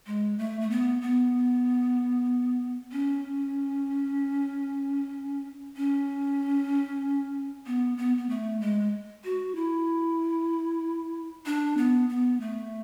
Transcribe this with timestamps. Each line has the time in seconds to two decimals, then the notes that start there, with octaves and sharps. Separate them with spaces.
0.07 G#3
0.38 A3
0.61 A3
0.70 B3
1.02 B3
2.92 C#4
5.76 C#4
7.66 B3
7.97 B3
8.17 B3
8.29 A3
8.61 G#3
9.25 F#4
9.56 E4
11.46 D4
11.77 B3
12.09 B3
12.41 A3